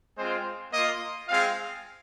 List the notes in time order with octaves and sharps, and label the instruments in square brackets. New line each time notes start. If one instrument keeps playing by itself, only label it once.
[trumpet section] G#3 C4 F4 C5
A#3 F4 D#5
G#3 C4 F4 F5